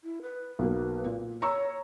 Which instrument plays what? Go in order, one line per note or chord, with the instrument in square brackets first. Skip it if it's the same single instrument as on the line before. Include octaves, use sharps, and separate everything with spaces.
[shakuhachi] E4
B4
[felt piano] B1 F#3 A#3
A#2
[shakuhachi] C#5 [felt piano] A#5 C#6 E6